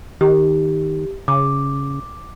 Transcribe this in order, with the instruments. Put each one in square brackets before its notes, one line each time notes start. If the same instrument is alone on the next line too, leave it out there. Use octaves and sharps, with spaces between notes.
[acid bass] D#3 [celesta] G4
[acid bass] C#3 [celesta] D6